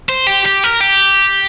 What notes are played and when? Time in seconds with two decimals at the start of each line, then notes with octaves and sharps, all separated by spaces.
0.09 C5
0.27 G4
0.46 G4
0.64 A#4
0.81 G4